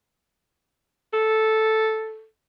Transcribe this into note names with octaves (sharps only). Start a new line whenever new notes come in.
A4